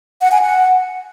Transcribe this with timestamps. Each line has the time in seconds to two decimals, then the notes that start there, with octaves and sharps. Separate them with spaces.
0.21 F#5
0.32 G#5
0.42 F#5